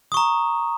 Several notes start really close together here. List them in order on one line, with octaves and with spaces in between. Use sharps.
D#6 C#6 A#5